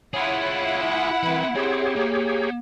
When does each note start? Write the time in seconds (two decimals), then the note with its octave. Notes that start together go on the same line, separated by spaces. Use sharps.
0.14 E4 F4 G#4 C#5 F#5
1.23 E3 C4 B5
1.55 C4 G4 G#4 C#5
1.96 A#3